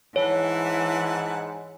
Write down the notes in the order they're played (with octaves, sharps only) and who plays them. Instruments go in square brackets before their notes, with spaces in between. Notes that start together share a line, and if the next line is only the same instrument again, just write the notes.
[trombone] G#2 [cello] E3 [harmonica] E4 F#5 A5 [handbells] C#5